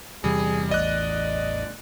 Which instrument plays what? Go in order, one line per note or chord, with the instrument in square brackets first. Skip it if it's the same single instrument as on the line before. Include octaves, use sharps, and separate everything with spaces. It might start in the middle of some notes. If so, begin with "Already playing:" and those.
[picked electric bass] E2 C3 E3 [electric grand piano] G3 [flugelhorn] G#4
[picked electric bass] A1 E2 A2 [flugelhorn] D5 [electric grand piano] D#5 F#6